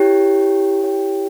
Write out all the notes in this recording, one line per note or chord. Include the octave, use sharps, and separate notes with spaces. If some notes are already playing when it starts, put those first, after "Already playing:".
Already playing: E4 G4 C#5 G5
E4 G4 C#5 G5